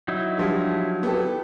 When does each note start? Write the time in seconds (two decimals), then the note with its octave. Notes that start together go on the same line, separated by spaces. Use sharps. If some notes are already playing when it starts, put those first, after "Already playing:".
0.08 F#3 D#4 E4
0.38 D3 F3 G3
1.03 B3 G4 A4